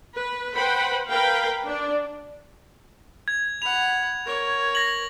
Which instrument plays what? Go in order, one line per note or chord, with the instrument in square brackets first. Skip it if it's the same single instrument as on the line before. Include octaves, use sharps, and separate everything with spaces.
[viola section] B4
B4 C5 F#5 G5 B5
A#4 B4 F5 G5 B5
D4 D5
[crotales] G#6
[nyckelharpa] F#5 B5 [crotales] F7
[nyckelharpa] A#4 C#5
[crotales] A#6 F#7